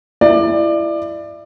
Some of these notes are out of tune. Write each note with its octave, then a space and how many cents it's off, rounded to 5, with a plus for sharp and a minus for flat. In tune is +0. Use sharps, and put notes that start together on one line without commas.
E4 +20 D5 +25